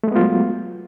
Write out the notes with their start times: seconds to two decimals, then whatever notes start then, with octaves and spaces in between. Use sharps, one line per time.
0.04 A3
0.08 G#3
0.12 B3
0.16 F4
0.20 F#3